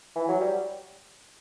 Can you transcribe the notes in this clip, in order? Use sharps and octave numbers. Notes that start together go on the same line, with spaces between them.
E3
F#3
G3